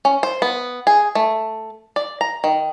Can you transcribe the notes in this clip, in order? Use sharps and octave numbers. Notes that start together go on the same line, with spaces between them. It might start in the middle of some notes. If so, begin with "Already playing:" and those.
C#4
C5
B3
G#4
A3
D5
A#5
D#3